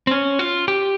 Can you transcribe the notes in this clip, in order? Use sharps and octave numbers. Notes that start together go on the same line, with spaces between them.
C4
C#4
F4
G4